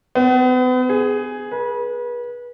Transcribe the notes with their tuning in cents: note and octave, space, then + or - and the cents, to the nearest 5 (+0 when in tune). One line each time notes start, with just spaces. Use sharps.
B3 +40
G#4 +5
B4 -30